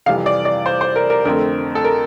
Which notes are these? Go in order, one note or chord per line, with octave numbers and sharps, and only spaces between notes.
F2 C3 E3 G3 F5
D5
D5
C5
C5
A#4
A#4
F2 D3 A3 C4 A#4
A4
A#4